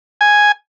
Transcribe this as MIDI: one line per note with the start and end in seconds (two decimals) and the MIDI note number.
0.21 0.52 80